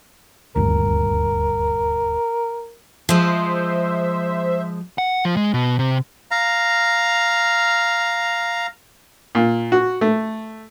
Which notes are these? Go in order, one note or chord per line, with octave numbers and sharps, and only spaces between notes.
D#1 D2 G2 A#4
F3 G#3 C5 E5
F#5
F3
G#3
B2
C3
F5 A#5
A#2
F#4
A3